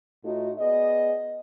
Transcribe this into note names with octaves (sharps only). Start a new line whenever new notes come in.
A2 A3 D#4 F4 F#4
B3 G#4 D5 D#5